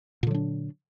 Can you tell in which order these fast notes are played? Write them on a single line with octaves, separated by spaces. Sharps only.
A#2 D3 F#3 D4